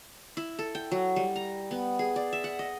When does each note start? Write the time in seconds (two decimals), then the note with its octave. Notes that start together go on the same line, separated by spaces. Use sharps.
0.37 E4
0.59 A4
0.75 G5
0.92 F#3
1.16 G3
1.36 A#5
1.71 B3
1.99 G#4
2.16 D5
2.33 E5
2.44 F#5
2.59 D#5